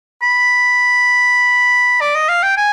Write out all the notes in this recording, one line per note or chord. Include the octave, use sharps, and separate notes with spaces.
B5
D5
D#5
F5
G5
G#5